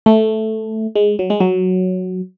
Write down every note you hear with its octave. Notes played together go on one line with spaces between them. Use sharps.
A3
G#3
F#3
G#3
F#3